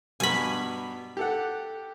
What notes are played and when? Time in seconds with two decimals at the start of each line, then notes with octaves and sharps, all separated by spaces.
0.20 G2 B2 G#5 B5
1.17 G4 A4 F#5